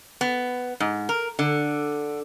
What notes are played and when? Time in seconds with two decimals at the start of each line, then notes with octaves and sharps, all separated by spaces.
0.21 B3
0.80 G#2
1.09 A#4
1.39 D3